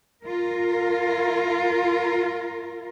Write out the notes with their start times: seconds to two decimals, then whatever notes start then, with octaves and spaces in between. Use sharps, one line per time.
0.23 F4 A#4